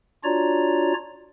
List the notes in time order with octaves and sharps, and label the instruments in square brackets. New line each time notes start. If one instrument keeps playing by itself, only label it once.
[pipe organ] D4 F4 F#4 C#5 D5 A#5